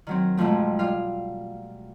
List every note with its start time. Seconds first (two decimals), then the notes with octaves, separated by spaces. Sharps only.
0.07 D#3 F#3 C4
0.37 F2 G#2 B2 F3 A3
0.79 G3 F4 F5